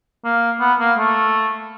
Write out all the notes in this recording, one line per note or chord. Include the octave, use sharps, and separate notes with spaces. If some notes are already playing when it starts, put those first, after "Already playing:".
A#3
B3
A#3
A3